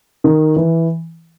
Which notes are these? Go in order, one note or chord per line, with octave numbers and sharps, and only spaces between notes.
D#3
E3